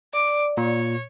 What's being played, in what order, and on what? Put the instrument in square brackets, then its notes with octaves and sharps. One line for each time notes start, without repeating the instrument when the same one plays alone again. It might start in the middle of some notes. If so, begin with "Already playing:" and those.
[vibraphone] D5 [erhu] D6
[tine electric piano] A#2 [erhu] C#5